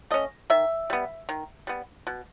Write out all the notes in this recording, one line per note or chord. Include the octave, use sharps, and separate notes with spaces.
A3 C#4 D#5
D#3 E5
G3 B3
D#3
G3 B3
B2